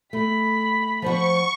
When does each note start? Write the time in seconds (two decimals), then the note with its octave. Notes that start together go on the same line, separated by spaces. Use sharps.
0.13 A3 B5
1.02 F3 C5 F#5 C#6